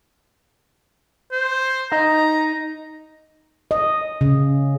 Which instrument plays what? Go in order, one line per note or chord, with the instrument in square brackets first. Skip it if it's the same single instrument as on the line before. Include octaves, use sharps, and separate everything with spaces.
[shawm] C5
[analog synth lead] D#4 [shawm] A#5
[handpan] D#5
C#3